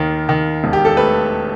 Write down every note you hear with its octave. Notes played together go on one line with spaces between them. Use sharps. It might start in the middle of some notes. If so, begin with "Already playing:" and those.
Already playing: D#2 D#3
D#3
E1
G4
A4
A3 B4